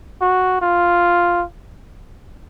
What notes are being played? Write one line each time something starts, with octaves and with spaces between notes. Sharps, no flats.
F#4
F4